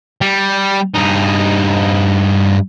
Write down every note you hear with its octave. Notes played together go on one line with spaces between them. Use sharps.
G3
G2 D#4